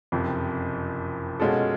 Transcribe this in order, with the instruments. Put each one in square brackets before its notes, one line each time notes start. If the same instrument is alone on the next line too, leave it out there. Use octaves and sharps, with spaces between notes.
[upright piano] F#1 F2 C3 F3
B2 G#3 C#4 F4 A4